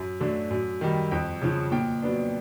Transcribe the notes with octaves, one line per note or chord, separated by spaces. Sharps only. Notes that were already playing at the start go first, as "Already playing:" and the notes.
Already playing: F#2
D3 F#3 A3 D4
F#2
D#3 G3
F2 G5
C#3 F3
A#2 G5
F#3 B3 D4